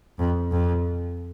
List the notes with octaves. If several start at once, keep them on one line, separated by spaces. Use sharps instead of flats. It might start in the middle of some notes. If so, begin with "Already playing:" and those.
F2
F2